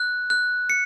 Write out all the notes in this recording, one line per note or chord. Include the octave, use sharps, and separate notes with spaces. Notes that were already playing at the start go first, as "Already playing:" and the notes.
Already playing: F#6
F#6
C#7